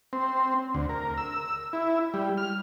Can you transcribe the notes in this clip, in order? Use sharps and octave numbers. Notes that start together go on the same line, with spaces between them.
C4
D2
A#4
E6
E4
G3
F6